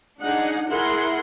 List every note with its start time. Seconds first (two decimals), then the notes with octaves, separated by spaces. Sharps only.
0.22 D4 D#4 G#4 F#5
0.69 E4 G#4 A#4 F#5 C6